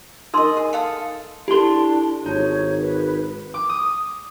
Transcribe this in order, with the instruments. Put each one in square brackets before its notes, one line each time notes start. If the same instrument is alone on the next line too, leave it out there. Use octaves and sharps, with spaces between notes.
[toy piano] D#4 A#4 C6 [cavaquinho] D#5 D#6
[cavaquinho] G#4
A4 F5 D#6
[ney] D4 [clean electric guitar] E4 C6 [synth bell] G4 A4
[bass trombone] G#1 [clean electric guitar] D#4 [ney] C#5
[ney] B4
[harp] D6
D#6